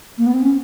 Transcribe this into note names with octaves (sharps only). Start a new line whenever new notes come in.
A#3
B3
C4
C#4